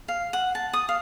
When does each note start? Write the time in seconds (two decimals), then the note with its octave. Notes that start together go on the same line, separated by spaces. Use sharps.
0.08 F5
0.33 F#5
0.55 A5
0.73 D#6
0.89 F5